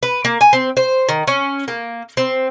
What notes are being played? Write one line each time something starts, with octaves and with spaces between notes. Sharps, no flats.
B4
A#3
G#5
C4
C5
D#3
C#4
A#3
C4